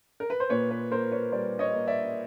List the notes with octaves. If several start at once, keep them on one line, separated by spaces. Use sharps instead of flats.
A#4
B4
C5
A#2 B4 C#5
B4
A#3 A#4 C5
B4 C#5
G3 C5 D5
C#5 D#5
A#3
D5 E5